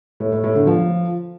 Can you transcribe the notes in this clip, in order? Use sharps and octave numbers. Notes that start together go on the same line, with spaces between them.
A2
A2
A2
D3
F3